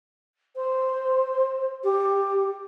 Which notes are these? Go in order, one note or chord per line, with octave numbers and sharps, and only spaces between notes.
C5
G4